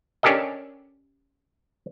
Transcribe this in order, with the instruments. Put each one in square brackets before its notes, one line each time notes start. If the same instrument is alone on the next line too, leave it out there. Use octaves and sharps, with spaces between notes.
[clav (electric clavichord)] C#4 D4 G4 A4 A#4 D#5